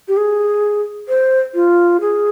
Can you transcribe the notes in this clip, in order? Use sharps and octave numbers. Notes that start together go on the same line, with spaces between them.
G4
G#4
C5
F4
G#4